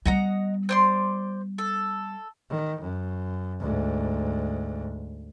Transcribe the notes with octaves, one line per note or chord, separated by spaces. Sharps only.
G3 B3 D#5 F#5 A#5
C5 D5 C6
A4
D#3
F#2
D2 G#2